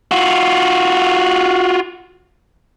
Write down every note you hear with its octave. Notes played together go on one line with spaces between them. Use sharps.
F4 F#4